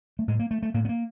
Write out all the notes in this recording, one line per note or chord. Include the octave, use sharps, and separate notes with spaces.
A3
A2 G#3
A#3
A3
A3
A2 A#3
B3
A#3